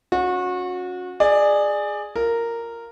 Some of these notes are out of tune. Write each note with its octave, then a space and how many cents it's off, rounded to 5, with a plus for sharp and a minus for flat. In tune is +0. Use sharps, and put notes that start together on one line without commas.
C#4 +5 F#4 -30
G#4 +0 D5 +20
F4 +0 A#4 -10